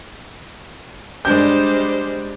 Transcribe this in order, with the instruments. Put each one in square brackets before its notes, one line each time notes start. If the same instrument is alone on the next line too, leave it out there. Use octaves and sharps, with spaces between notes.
[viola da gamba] G3 G#3 C5 [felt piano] D4 G6